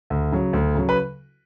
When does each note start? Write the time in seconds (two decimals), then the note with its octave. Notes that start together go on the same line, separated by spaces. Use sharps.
0.10 D2
0.32 C#3 F#3
0.53 D2
0.75 C#3 F#3
0.89 B4